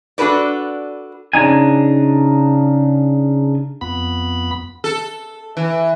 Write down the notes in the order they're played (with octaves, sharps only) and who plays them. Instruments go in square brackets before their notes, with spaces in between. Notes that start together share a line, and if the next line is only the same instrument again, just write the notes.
[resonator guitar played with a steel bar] D4 F#4 A4 B4 D5
[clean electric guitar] C#3 D4 D#4 G#5
[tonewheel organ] F2 B3 B5
[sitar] A4
E3